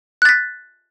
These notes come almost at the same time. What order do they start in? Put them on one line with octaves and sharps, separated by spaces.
F#6 A6 B6